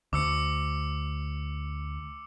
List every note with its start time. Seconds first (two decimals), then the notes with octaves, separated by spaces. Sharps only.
0.13 D2 D6 E6 C#7